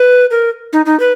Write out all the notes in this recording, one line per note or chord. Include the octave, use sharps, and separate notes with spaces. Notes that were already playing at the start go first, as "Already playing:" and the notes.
Already playing: B4
A#4
D#4
D#4
B4